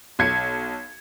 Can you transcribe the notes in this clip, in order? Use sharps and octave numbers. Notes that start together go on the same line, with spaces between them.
B1 G#6 C#7